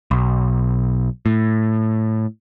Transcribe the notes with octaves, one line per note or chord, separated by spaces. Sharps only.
B1
A2